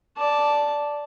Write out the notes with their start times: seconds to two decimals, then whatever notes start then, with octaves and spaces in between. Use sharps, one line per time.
0.17 D5 A5